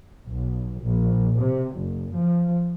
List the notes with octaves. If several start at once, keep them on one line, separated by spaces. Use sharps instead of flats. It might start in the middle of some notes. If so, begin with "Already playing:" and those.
B1
A#1
C3
F#1
F3